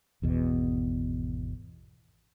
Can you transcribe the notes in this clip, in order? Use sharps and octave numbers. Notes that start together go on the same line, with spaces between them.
G#1 E2 B2